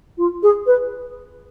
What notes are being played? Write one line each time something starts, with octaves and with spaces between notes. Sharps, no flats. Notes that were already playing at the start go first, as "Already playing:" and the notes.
F4
G#4
B4